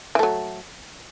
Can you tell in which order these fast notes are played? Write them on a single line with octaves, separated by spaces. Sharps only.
E3 A3 F#3